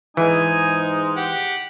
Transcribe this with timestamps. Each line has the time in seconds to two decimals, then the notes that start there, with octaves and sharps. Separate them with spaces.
0.17 G#2 E3 G#3 D#4 G#5
1.17 G4 F#5